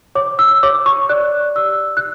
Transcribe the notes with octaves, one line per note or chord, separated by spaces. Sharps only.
C#5 D6
E6
C#5 D6
C#6
D5 F#6
G4 E6
F#6